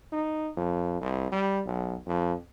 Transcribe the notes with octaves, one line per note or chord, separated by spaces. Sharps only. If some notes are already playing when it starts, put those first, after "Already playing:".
D#4
F2
C2
G3
B1
F2